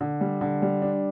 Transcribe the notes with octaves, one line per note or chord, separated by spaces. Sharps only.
D3
G3
D3
G3
D4